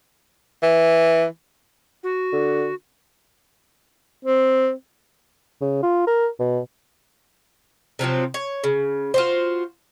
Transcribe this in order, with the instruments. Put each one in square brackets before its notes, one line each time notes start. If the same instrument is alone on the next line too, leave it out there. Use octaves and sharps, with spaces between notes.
[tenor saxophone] E3
[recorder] F#4
[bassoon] D3
[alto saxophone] C4
[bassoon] C#3
F4
A#4
B2
[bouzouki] C3 F3 F#3 C4
C#5
C#3
F4 F#4 C5